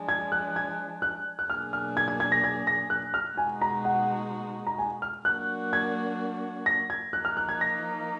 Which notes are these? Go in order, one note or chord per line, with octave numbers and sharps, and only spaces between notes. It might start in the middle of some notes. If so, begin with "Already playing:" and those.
Already playing: F3 G#3 D4
G#6
F#6
G#6
F#6
F#6
B2 F#3 A#3 D4 G#4 F6
F6
G#6
G#6
G#6
A#6
G#6
A#6
F#6
F6
B2 G#3 D#4 F#4 G#5
A#5
F#5
A#5
G#5
F6
F#3 A#3 D4 F#4 F#6
G#6
A#6
G#6
F3 A#3 D#4 F#6
F6
F#6
G#6
A#6